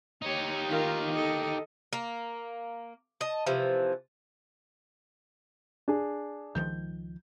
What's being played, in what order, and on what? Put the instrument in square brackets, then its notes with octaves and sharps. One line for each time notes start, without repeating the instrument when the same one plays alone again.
[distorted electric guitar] D#4 G4 [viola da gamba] C#5
[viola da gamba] D#3 F4 A#4
A4 D#5
[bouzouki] A#3
D#5 A5
C3 E3 F3
[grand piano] D4 G#4
[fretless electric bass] C#2 D#3 F3 [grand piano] G6